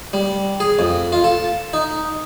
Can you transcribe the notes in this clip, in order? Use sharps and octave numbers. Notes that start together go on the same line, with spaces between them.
G3
G#4
F2
F4
A4
D#4